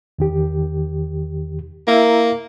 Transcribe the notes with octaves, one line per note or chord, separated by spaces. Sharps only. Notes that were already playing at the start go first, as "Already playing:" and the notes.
E2 D#3 G4
A#3 E4 E5 A#5